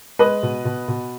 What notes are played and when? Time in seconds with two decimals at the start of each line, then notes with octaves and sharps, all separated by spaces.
0.19 G#3 B4 D#5
0.43 B2
0.65 B2
0.88 B2